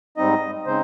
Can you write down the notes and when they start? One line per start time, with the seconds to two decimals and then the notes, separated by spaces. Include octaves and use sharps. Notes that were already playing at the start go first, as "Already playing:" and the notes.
0.17 G#2 G3 C4 D#4 D#5
0.66 C#3 G#3 C4 D#4 C5